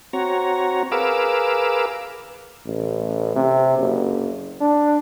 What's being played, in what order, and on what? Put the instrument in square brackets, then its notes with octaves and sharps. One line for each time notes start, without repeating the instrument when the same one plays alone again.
[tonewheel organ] C4 F#4 C#5 A#5
G#4 A#4 B4 F5 D6 E6
[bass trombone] A1
C3
F#1
D4